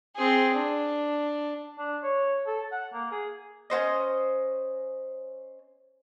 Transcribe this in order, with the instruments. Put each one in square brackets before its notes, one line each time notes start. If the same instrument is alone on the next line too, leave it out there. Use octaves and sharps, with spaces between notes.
[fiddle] C4 G#4
D4
[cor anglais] D4
C#5
A4
F#5
A#3
G#4
[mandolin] C#4 F#4 C5 D#5